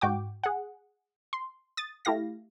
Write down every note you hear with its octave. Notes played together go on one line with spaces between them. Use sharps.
G#2 F#4 G5 D6
G#4 F#5
C6
D#6 A6
A3 E4 G4 F5 A#6